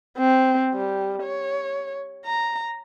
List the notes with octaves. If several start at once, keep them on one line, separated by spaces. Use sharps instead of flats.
C4
G3
C#5
A#5